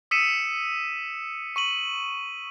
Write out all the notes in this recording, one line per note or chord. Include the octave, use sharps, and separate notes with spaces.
D#6 E6 B6 C#7 D#7 E7
C#6 D#7 F#7